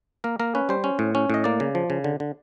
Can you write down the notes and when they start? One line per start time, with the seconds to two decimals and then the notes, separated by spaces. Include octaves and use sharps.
0.24 A#3 A#4
0.40 A#3 A#4
0.55 C#4 B4
0.69 G3 C5
0.84 C#4
0.99 A2
1.15 C#4
1.30 A2 D#5
1.44 A#3 D5
1.60 C#3
1.75 F3
1.90 C#3
2.04 D3
2.20 D3